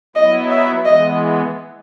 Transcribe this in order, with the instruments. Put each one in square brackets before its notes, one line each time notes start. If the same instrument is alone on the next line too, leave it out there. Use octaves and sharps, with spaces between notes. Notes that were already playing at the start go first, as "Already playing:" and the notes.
[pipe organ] F#3 B3 E4 [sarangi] D#5
[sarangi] E5
[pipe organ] E3 G#3 B3 [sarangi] D#5